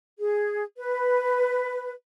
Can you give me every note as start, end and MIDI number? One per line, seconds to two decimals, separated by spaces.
0.19 0.62 68
0.78 1.92 71